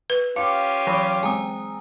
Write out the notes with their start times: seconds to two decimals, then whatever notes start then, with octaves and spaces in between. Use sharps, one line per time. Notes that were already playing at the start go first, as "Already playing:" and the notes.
0.10 B4
0.36 C#4 F4 G4 F5 D6
0.87 E3 F#3 B5 D#6
1.23 G#3 C4 G#5 A#5 D#6